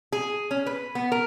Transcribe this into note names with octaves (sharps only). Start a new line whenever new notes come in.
G#4
C#4
B4
B3
A#4